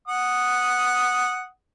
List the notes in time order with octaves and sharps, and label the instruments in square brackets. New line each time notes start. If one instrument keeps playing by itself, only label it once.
[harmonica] F#5 D#6